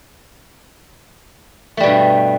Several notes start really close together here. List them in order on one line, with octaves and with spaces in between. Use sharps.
A3 G3 B2 G2